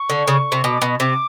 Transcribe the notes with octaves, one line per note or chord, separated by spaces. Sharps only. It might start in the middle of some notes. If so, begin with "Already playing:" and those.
Already playing: C#6
D3
C#3
C3
B2 D6
B2
C3 D6